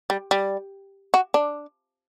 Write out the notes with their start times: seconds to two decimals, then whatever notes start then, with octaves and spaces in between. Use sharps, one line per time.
0.10 G3
0.31 G3
1.14 F#4
1.34 D4